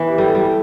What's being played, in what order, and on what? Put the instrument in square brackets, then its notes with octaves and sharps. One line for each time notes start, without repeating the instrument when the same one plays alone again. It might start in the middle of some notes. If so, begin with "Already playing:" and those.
Already playing: [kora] E3 B3
[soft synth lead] G4
[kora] G3 [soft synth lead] A4
[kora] G3